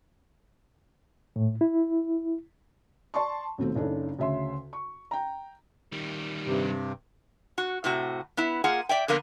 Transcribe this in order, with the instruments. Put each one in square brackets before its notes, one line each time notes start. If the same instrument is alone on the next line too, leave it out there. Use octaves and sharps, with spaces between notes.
[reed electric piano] A2
E4
[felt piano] D5 A5 C6 C#6
D#2 B2 A3 C4
F#1 C#3 D4 D#4 A4
D2 C#3 E5 C6
C#6
G5 A#5
[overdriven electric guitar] D#3 G3
[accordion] G2 C3
[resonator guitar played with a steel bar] F#4
A2 C3 F#4
B3 E4
A#3 F4 G#4 F#5
D5 E5 G5
D3 F3 A#3 B3